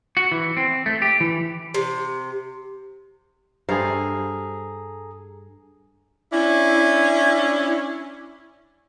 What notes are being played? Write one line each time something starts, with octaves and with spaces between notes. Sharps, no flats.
F#4
E3
C4
A3
G4
E3
C3
G2 G#4 A4 C5 F5 A#5
C#4 D4 E4